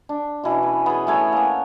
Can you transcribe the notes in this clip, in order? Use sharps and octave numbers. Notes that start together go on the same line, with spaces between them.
D4
B2 E3 C#4
B4
B3 G#4
A2 A3 C#5 G#5
A#3 B3